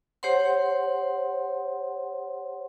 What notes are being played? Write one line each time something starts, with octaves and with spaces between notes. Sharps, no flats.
G4 C5 C#5 F#5 C6